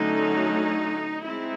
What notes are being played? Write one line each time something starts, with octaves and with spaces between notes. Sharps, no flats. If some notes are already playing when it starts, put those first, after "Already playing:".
Already playing: D3 F#3 A3 C#4 D#4
G#3 C4 D#4 E4